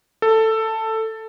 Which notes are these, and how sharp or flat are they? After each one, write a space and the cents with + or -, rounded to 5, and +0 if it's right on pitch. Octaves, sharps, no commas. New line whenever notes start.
A4 +10